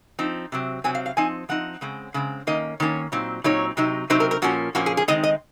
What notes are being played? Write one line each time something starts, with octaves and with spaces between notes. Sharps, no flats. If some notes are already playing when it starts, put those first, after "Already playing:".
F3 C4 D#4
C3 F#3 C4
C3 F#3 C4 G#5
F5
F5
F3 C4 D#4 G#5
F3 C4 D#4 F#5
C#3 G#3 C4
C#3 G#3 C4
D#3 A#3 C#4 D#5
D#3 A#3 C#4 C#5
A#2 F#3 C4 D#4
A#2 F#3 C4 D#4 C#5
C3 F#3 C4 D#4
C3 F#3 C4 D#4 C5
A#4
A#4
A#2 F3 A#3 C#4 F#4
A#2 F3 A#3 C#4 F#4
G#4
G#4
D#3 G#3 C4 D#4 D#5
D#5